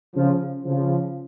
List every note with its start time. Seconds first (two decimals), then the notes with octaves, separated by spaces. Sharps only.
0.15 C#3 F3
0.65 C#3 F3